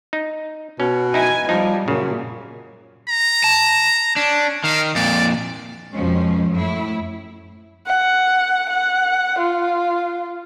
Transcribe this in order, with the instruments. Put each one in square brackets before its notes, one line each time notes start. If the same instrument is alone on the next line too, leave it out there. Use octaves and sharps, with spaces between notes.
[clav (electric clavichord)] D#4
[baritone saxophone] B2 [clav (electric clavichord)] C#4
[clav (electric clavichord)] D#4 E4 [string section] G#5
[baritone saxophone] F3 [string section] G3 [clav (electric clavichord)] D#4
[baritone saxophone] F#2 [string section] A#2 [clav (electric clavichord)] C#3
[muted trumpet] A#5
[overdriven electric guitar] A5
[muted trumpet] C#4 [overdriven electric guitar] D4
[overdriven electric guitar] D#3 [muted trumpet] F5
[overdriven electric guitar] F2 A#2 [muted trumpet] D5
[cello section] F2 B2 F3 G#3 C#4
F#2 A2 A3 E4
[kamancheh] F#5
F#5
F4